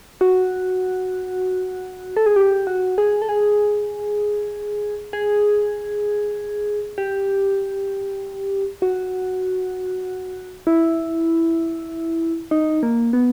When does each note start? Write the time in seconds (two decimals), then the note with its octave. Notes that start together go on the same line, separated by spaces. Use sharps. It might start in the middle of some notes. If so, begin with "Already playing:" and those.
0.21 F#4
2.17 A4
2.26 G#4
2.36 G4
2.67 F#4
2.98 G#4
3.22 A4
3.29 G#4
5.13 G#4
6.98 G4
8.82 F#4
10.67 E4
12.51 D#4
12.83 A#3
13.13 B3